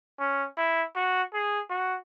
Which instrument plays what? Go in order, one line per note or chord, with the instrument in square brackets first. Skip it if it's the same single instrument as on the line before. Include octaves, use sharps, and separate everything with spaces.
[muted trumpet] C#4
E4
F#4
G#4
F#4